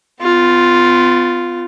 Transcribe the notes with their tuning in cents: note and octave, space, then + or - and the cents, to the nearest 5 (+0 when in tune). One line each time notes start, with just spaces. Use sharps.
B3 +40 F4 +0